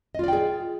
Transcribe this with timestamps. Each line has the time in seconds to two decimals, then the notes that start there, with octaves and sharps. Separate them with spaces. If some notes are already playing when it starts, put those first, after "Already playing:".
0.15 D#5
0.19 F4
0.24 D5
0.28 G5
0.33 G#4